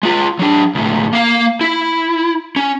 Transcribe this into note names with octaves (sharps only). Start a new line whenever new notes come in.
G#3 F4
F#3 D4
C#2 A2
A#3 F5
E4
C#4